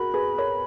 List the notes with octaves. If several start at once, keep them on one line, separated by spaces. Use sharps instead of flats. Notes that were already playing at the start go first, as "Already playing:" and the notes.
Already playing: F#4 G#4 A#4 B5
G#4 B4
A#4 C#5